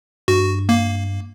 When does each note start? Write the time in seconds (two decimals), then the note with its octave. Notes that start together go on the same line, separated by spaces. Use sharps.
0.28 G2 F#4
0.69 A#3